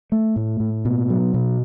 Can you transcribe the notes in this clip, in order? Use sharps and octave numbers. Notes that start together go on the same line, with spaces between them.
A3
A2
A2
B2
F#3
B2